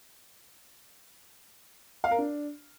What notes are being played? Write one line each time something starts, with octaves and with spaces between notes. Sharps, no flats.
F5
A#4
D4